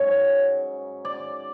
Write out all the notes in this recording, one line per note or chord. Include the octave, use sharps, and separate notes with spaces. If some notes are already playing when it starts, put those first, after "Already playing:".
Already playing: G#2 F#3 C#4 C#5
D5